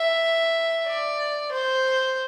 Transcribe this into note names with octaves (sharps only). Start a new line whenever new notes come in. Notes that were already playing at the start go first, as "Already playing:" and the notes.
Already playing: E5
D5
C5